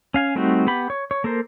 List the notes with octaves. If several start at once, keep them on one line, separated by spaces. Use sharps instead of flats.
C#4 F5 G#5
G3 A3 C4 D#4 F#4
B3 G4 B5
C#5
C#5
A#3 A4 A#4 C5